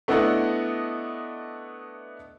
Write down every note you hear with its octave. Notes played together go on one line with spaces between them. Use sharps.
A3 B3 D4 E4 D#5 F#5